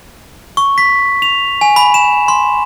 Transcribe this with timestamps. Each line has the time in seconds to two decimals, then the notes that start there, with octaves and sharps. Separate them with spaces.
0.57 C#6
0.78 B6
1.22 F7
1.61 G#5
1.76 B5
1.94 E7
2.28 C6